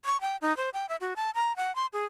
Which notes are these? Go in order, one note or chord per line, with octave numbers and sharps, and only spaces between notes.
C#6
G5
D#4
C5
G5
E5
F#4
A5
A#5
F#5
C6
G#4